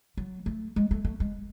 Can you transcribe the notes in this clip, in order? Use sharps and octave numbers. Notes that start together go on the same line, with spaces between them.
F#3
A3
G#3
A3
A3
G#3